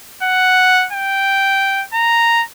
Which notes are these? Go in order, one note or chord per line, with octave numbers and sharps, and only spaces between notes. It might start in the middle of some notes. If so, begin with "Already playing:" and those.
F#5
G5
A#5